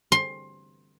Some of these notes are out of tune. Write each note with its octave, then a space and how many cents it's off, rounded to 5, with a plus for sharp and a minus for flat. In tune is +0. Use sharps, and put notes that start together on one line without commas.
C6 +20